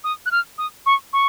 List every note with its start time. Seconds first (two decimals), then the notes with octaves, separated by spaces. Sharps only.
0.04 D#6
0.26 F#6
0.31 F6
0.58 D#6
0.86 C#6
1.13 C#6